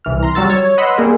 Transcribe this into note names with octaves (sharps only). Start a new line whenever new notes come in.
C2 E3 F6
A#5 C6 F6
F#3 G3 F#4 E6 A6
C#5
B4 D#5 F#5 B5 C6 E6
G3 A#3 G#4 A#4